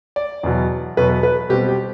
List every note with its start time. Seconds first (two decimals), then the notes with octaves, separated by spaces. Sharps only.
0.16 D5
0.43 E2 B2 F#3
0.97 E2 B2 F#3 B4
1.23 B4
1.49 B2 G3 C4 G4
1.68 G4